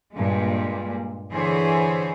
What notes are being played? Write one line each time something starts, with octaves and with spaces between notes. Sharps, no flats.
G2 A#2 G3 G#3
D3 E3 G#4 C5 C#5